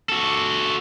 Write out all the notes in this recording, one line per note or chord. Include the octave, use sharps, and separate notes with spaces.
F#4 A4